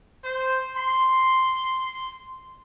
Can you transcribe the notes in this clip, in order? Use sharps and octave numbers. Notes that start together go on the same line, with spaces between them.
C5
C6